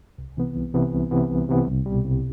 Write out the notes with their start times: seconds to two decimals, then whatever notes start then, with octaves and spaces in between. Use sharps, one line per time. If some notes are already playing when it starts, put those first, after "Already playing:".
0.18 C2
0.37 C3 E3 B3
0.56 C2
0.74 C3 E3 B3
0.93 C2
1.11 C3 E3 B3
1.30 C2
1.49 C3 E3 B3
1.67 C2
1.86 B2 G3
2.04 C2